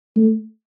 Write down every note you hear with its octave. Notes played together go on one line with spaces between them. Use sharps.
A3